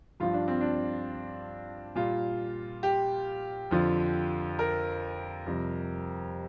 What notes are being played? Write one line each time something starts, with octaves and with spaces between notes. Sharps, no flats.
G2 F3 F4
D4
C4
D4
A#2 G3 F4
G4
F2 D3 F3
A#4
F2 C3 G3